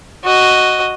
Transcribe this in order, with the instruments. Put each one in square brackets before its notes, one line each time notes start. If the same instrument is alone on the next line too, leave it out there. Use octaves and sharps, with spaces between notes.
[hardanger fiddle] F#4 D#5